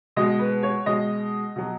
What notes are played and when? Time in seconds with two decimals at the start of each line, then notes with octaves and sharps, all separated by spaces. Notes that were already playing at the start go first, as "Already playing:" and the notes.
0.16 B2 G#3 D#5
0.39 B4
0.63 C#5
0.86 B2 G#3 D#5
1.56 B2 F#3